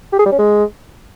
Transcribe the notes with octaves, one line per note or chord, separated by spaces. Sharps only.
G4
G#4
G3
C#4
G#3